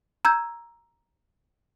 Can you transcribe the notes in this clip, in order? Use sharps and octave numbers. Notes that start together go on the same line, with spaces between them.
A#5 E6 G6 G#6